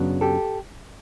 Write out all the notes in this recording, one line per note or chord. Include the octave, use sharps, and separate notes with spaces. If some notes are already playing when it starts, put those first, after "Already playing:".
Already playing: F#2 C#3 F#3 B3 D4
G4 A4